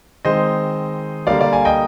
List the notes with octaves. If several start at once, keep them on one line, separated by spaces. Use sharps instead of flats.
D#3 G#3 C4 C5 D#5
D3 G3 A#3 D5 F5
D5 F5
F5 G#5
D#5 G5